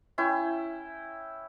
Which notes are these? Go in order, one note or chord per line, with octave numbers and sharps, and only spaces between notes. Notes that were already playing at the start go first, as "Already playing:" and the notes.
C#4 E4 G5